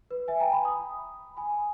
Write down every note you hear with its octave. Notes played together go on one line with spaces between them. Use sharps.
B4
E5 G#5
G5 A#5
G#5 B5
B5 D#6
G#5 B5